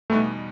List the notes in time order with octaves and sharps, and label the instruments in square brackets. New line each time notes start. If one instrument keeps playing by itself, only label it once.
[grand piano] E2 B2 G3 B3 D#4 [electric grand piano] A3